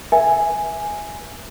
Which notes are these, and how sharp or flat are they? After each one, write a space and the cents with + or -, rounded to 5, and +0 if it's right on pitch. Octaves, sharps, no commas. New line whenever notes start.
B4 -45 E5 +0 G#5 +0